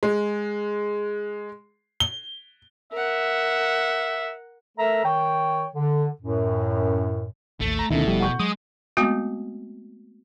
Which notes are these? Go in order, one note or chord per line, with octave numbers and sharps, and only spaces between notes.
G#3
G7
A#4 E5 F#5
A3 A4 A#4 E5 A#5
D#3 C#5 G5
D3
F#2 A2
A1 D#2 A3
A#5
D2 B2 D#3 A3 C#4 E4
E1 F3 G3
F#5 C#6 G6
F#3 G#3 D#6
G#3 A3 B3 C4 F#4